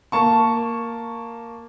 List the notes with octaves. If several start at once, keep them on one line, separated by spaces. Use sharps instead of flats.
A#3 A5 C#6